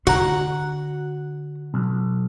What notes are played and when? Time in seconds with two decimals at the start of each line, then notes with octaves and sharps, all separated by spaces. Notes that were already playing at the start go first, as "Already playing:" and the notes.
0.07 D3 F#4 F#5 A#5
1.74 B1